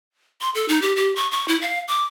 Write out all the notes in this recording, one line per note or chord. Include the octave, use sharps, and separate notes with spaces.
C6
A4
D#4
G4
G4
C#6
C#6
E4
F5
D6